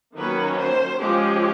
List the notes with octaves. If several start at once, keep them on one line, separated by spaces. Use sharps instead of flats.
D#3 F#3 A#3 C#4 B4
C5
F3 G#3 C#4 G4